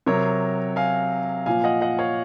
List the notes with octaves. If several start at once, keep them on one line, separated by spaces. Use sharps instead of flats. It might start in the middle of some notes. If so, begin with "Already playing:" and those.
C3 F#3 A#4 C#5
F5 G#5
A#2 F3 F5 G#5
D#5 F#5
D#5 F#5
C#5 F5